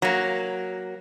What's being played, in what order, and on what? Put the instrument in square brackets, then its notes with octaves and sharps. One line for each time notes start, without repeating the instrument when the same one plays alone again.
[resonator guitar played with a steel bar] F#3 A#3